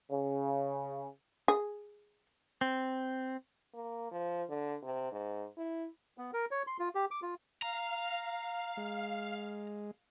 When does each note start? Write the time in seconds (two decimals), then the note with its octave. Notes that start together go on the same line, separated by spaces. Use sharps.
0.11 C#3
1.48 G#4
2.61 C4
3.74 A#3
4.11 F3
4.49 D3
4.83 C3
5.12 G#2
5.57 E4
6.18 B3
6.34 A#4
6.51 C#5
6.67 C6
6.79 F4
6.95 G4
7.11 D6
7.22 F4
7.62 F5 A#5
8.77 G#3